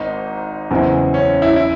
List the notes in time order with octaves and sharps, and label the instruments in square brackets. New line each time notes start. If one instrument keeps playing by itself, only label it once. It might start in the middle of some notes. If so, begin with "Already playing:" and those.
Already playing: [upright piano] G#1 G#2 [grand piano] D#4
[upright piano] F#1 E2 C#3 E3 C4
[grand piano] C#4
E4
E4